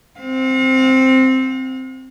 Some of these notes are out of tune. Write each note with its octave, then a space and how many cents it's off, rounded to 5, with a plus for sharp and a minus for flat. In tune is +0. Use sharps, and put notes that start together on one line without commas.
C4 +0 F5 +45